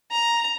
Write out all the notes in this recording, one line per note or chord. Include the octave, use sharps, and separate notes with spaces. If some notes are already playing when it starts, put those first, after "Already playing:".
A#5